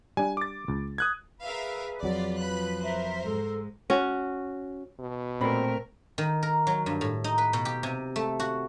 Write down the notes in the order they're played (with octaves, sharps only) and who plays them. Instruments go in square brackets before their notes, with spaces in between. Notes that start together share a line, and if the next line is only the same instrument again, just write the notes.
[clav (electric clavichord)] G3 D4 [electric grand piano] G#5
[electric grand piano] D6 A6
[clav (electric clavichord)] C#2
[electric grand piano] D#6 F#6 G#6
[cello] G#4 B4 [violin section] A#4 E5 F5
[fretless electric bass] F2 F#3 [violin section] F4 D5
[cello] F3 B4 [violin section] B5 F#6
[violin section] A#4 C5 [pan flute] E5
[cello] G#2 G#3 [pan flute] A4
[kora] C#4 F#4
[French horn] B2
[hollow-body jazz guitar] A#2 B5 [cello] A3 A#4 [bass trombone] C4
[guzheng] D#3
A#4
F#3
G2
A2
D#4
B4
B2
G4
C3
A3
F#4